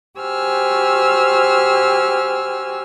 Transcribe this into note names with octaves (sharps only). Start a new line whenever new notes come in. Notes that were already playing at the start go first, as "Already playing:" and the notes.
F#4 G4 C5 G#5 E6 F6